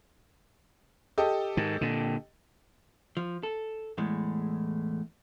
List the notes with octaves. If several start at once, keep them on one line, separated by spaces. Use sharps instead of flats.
G4 A4 D#5
G#2 D#3
A#2 D3
F3
A4
E2 A2 G#3